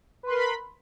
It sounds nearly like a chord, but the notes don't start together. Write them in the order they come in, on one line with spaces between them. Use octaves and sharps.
B4 C6 A#4 B5